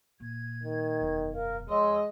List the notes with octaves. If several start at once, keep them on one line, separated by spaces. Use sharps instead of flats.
A#2 G#6
D#3
E1 F#2
A#4 F5
F2 G#3 C#5 D#5 C6 E6